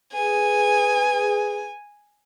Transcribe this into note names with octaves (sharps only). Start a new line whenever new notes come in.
G#4 B4 G#5